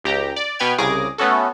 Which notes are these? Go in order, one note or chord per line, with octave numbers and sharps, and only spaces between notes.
C#2 G4 A#5
D5
B2 B3 B4 G5 F6 G#6
C2 C#3 G#4 D6 A#6
A3 B3 C#4 F#4 A4